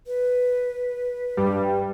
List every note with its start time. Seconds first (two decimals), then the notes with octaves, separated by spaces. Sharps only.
0.07 B4
1.37 G2 G3